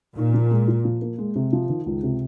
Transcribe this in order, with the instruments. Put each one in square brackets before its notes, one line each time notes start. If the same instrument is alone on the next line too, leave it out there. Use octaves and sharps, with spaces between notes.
[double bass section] A#2 [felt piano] D#4
[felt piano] F3
G#3
F4
F3
A#3
G#3
C3
F3
D#3
C#2
C3